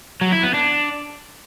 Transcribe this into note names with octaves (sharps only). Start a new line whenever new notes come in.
F#3
E4
B3
D4